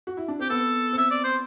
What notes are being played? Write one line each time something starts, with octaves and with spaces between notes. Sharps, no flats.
F#4
E4
D4
C4 G4
B3 A4
C4 E5
D5
C5